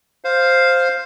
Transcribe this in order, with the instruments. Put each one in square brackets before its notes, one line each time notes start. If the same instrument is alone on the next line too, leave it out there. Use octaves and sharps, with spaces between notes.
[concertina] C5 F5